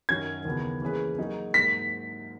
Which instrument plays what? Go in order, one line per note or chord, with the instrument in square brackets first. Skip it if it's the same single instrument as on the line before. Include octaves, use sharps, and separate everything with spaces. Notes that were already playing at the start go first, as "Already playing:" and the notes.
[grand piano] F#2 D#3 F#3 C#4 [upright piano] G#6
[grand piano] D#2 C#3 E3 B3
E3 A#3 C#4 G#4 B4
F#3 A#3 D#4 G#4
[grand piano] G#2 F#3 A#3 [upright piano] B6